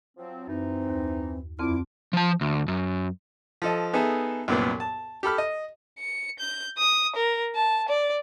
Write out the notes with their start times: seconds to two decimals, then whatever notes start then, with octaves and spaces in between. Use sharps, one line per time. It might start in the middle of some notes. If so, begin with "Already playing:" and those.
0.17 F3 F#3 C4
0.47 F#2 E3 C4 D#4
0.88 D#2
1.59 C2 F2 D3 C4 E4 D6 F6
2.13 F3 A5
2.41 D2
2.68 F#2
3.62 F3 A4 D#5
3.93 B3 D#4 G#4 A4 E5
4.48 C2 F#2 A#2 B3
4.80 A5
5.23 G4 A4 B5 F6
5.38 D#5
5.99 C#7
6.39 G6
6.78 D#6
7.16 A#4
7.55 A5
7.89 D5